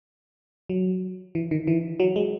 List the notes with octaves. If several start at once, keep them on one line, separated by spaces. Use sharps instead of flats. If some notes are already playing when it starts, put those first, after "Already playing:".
F#3
E3
D#3
E3
F#3
G#3